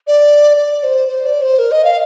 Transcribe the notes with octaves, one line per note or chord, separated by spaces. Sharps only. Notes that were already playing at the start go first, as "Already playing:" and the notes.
D5
D5
C5
C5
D5
C5
A#4
D#5
F5